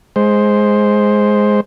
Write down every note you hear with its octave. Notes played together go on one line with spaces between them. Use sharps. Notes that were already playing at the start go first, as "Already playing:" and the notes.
G#3 C5